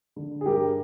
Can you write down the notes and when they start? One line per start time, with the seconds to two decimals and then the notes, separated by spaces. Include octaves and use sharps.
0.16 D3
0.41 G#4
0.46 G2 G4 A#4